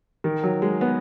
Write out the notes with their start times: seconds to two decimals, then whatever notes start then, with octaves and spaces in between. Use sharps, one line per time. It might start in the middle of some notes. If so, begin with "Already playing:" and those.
0.24 D#3
0.43 F#3
0.62 G#3
0.81 B3